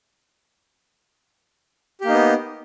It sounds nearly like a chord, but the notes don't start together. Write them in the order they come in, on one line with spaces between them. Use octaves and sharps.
G4 A#3 D#4 B3